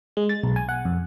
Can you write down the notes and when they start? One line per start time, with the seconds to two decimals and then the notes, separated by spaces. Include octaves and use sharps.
0.17 G#3
0.29 A6
0.44 B1
0.56 G#5
0.69 F#5
0.85 F2